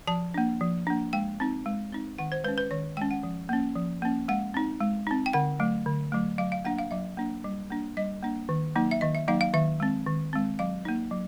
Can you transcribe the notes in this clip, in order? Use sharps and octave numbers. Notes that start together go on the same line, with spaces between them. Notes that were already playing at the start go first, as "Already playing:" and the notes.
F3 A5
A#3 D4
F3
A#3 D4
G#3 G5
C4 D#4
G#3
C4 D#4
D#3 F#5
C5
G#3 C#4 B4
B4
D#3 C#5
G#3 C#4 G5
F#5
F3
A#3 C#4
F3
A#3 C#4
G#3 F#5
C4 D#4
G#3
C4 D#4
G5
D3 F#5
F#3 A3
D3
F#3 A3
F#3 F5
F5
A#3 D4 F#5
F5
F#3 E5
A#3 D4
G3
A#3 D4
G3 D#5
A#3 D4
D#3
F#3 A#3 D#4
E5
D#3 D#5
E5
F#3 A#3 D#4 F5
F5
D#3 E5
G#3 C4
D#3
G#3 C4
F#3 F5
A#3 D#4
F#3